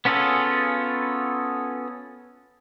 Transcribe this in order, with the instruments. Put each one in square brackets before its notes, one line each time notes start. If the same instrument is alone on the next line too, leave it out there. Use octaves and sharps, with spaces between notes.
[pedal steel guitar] B3 C#4 F4 G#4 A4